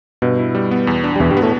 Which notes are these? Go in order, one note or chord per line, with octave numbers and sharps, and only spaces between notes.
G2 B2
E4
G3
B3
E2
D4
G3
E2 B2 E3
G2 G3
B3
A2 A3